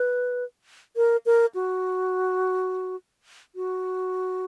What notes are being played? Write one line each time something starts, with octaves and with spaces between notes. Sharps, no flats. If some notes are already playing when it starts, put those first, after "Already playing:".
Already playing: B4
A#4
A#4
F#4
F#4